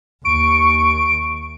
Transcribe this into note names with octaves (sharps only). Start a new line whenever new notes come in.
D#2 C#6 D7